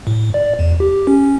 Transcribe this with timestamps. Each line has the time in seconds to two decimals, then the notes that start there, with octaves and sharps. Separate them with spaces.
0.07 A2
0.34 D5
0.59 E2
0.80 G4
1.07 C#4